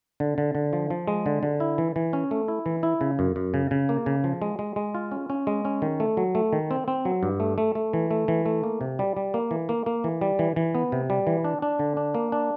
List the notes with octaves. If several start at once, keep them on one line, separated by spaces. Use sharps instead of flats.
D3
D3
D3
F3
F3
G#3
D3
D3
E4
E3
E3
C#4
A3
E4
E3
E4
C#3
F#2
F#2
C#3
C#3
A#3
C#3
F3
G#3
G#3
G#3
F4
C#4
C#4
G#3
C#4
D#3
A3
F#3
A3
D#3
C4
C4
F#3
G2
A3
A3
A3
E3
A3
E3
A3
A#3
C3
G3
G3
A#3
E3
A#3
A#3
E3
G3
E3
E3
B3
C3
G3
E3
D4
D4
D3
D4
A#3
D4